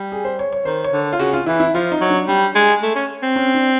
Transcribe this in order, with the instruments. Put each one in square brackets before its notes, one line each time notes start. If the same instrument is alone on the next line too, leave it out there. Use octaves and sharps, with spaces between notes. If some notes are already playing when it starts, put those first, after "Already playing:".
Already playing: [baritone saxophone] G3
[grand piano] G#4
C5
C#5
C#5
[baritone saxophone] D#3 [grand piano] C5
[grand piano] C#5
[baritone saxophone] D3
[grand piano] F4
[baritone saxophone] C#3 [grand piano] F#4
[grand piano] F4
[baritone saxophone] E3 [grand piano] E4
[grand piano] E4
[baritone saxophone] F3 [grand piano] F4
[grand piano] D#4
[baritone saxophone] F#3
[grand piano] D4
[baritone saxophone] G3 [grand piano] D4
[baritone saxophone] G#3
A3
C#4
C4
[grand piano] C#4
D4